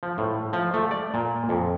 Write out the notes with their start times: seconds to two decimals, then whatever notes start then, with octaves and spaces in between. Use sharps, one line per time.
0.03 F3
0.18 A2
0.53 F3
0.74 A3
0.91 D5
1.14 A#2
1.49 F2